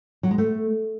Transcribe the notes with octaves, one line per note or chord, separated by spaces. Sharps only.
F#3
G#3
A3